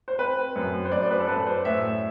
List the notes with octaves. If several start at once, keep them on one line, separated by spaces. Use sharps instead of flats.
C5
C4 B4
F#2
C5
F#2 D5
B4
A4
F#2 B4
C5
A2 E5